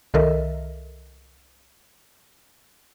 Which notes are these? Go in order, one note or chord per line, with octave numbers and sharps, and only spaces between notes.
C2 D#3 A4 A#4 D#5 E5